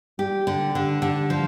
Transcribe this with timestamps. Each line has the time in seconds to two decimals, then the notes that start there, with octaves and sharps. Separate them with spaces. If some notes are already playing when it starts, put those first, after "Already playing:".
0.19 G3 G4
0.47 D3
0.75 D3
1.02 D3
1.30 F3